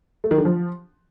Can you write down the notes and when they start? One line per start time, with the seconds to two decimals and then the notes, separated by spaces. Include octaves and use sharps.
0.24 A3
0.31 D#3
0.38 D3
0.45 F3